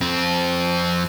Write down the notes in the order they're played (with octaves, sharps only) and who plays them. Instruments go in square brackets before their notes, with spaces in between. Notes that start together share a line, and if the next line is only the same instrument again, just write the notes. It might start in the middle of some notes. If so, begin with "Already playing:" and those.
[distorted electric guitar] F2 C4